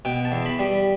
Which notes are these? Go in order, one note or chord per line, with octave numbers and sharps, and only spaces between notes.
B2 G5
A5
E2
B5
G3